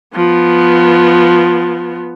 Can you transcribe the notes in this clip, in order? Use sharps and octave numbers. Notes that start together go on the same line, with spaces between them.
F3 B3